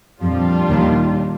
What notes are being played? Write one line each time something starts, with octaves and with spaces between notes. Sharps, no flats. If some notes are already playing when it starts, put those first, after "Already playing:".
F2 A#2 F3 G3 D4 F4
D#2 D#3